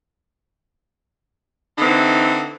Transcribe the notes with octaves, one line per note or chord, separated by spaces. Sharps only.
D3 E3 C4 D#4